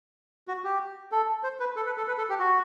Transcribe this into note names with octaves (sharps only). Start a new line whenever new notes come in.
F#4
G4
A4
C5
B4
A4
B4
A4
B4
A4
G4
F#4